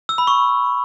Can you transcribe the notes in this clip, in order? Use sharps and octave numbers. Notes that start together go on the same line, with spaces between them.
E6
B5
C#6